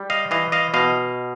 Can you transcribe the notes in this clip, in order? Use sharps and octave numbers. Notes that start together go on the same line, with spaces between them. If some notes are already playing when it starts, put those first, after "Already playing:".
Already playing: G3
D#5 F5
E3 D#5 F5
D#5 F5
B2 D#5 F5